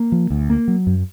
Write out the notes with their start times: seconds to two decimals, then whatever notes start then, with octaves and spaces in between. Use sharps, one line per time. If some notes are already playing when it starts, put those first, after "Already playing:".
Already playing: A#3
0.12 F3
0.30 D2
0.49 A#3
0.68 F#3
0.87 F#2